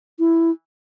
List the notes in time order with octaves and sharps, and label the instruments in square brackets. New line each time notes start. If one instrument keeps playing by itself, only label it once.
[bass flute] E4